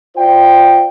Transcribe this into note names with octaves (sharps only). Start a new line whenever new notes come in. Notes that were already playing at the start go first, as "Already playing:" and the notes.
F4 C5 D5 G5